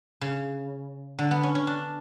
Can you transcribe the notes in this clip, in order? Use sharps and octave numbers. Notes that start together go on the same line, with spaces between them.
C#3
D3
B3
C#4
C#4
D4